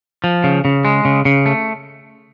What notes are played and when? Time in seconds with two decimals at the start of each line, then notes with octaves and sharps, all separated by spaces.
0.24 F3
0.44 C#3
0.65 C#3
0.85 G#3
1.05 C#3
1.25 C#3
1.46 A3